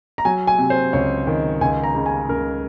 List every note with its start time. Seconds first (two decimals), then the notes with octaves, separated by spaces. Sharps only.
0.18 A#5
0.25 F#3 G#5
0.47 G#5
0.58 C3
0.70 C5
0.93 C#2 C#5
1.27 D#3
1.61 C#2 G#5
1.84 A#5
1.95 C#3
2.06 G#5
2.29 C#2 A#4